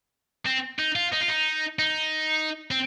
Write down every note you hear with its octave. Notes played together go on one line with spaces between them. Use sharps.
C4
D#4
F4
D#4
F4
D#4
D#4
C4